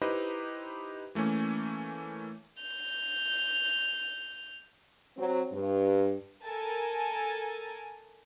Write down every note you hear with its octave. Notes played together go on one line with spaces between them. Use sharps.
D#4 E4 G4 B4 C5 D#5
E3 A3 A#3 C#4
G6 F7
F#3 C4
G2
A4 A#4 G#5 A5